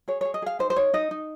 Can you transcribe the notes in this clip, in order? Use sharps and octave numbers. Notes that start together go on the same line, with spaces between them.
G#4 C#5
G#4 C#5
D#5
G#4 F5
D#4 C5
C5
D#4 C#5
D#4 D#5
D#4